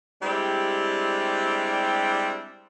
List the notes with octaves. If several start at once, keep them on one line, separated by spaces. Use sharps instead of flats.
G3 G#3 C4 D4 E4 G4